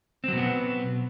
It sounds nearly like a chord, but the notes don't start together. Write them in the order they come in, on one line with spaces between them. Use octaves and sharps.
C4 F#3 B2 B3